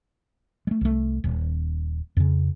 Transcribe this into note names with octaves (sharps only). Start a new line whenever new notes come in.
G#3 A3
C2 A3
D#1
F2 C#3